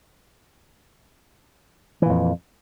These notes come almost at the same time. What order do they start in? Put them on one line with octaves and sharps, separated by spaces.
E3 A#2 F2